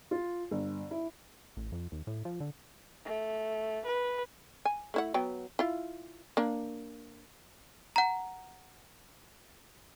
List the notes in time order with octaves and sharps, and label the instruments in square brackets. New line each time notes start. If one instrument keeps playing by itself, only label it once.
[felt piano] F4
G1
E4
[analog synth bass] A1
F2
D#2
A2
F3
D3
[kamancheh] A3
B4
[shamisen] G#5
A3 E4 F#5
F#3 B3 G5
E4 F4
A#3 D4
[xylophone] F#5 A#5